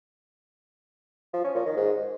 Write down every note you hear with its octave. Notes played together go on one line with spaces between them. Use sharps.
F3
C#4
A#2
D#3
G#2